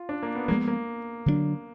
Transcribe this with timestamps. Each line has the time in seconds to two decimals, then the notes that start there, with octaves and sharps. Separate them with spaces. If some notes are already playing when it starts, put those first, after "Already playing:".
Already playing: F4
0.09 D4
0.23 A#3
0.35 B3
0.48 F3 A#3
0.51 G#3 B3
0.68 A#3
1.26 D3 F#3 B3 D4